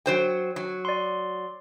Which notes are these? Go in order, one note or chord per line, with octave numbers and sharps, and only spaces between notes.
F#3 C5 G5
F#3
D5 C6